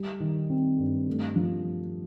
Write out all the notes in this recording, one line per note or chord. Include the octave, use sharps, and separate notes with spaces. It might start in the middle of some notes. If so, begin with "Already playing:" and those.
Already playing: G3
D#3
C4
G2
A3
F3